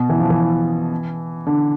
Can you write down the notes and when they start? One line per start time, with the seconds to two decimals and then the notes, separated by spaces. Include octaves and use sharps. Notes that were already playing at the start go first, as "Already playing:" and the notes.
Already playing: B2
0.09 E3
0.20 F3
0.30 E3
1.47 D3